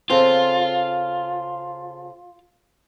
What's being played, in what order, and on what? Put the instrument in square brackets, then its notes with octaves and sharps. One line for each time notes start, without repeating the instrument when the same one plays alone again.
[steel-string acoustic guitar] C#3 C4 A4 [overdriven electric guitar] F4